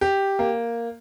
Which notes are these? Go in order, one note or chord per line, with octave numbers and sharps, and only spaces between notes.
G4
A#3